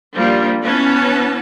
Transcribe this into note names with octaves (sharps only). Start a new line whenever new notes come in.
F3 G3 A#3 D4
E3 B3 C#4 A5